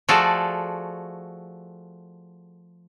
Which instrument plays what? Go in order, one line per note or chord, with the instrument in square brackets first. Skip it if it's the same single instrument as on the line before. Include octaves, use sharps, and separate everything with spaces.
[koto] F3 A3 F#4 G#4 A4 D5